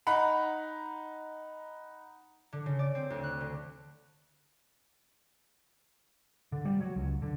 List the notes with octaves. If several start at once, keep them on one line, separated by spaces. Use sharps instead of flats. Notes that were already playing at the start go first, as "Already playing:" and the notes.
D#4 F#5 A#5 B5
D3
C#3
D5
C4
D2
F#6
D3
D3
G3
F#3
C#2
D3